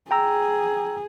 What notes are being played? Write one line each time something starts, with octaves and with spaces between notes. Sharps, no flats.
G#4 G5 A#5 E6